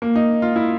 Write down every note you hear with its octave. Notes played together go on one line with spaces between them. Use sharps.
A#3
D#4
F4
E4